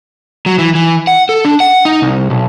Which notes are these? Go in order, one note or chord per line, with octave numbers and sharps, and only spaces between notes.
F#3
E3
E3
F#5
A4
D4
F#5
D#4
C2
B1